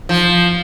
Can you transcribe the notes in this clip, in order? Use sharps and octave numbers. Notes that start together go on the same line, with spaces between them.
F3